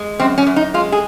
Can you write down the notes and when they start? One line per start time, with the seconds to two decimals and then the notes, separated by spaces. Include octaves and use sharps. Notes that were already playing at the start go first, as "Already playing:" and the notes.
Already playing: G#3
0.19 F#2 C4
0.38 C#4
0.47 F#2
0.56 D#4
0.74 G#3 F4
0.92 G#4